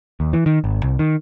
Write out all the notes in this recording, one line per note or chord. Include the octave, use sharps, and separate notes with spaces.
D#2
E3
D#3
G#1
C2
D#3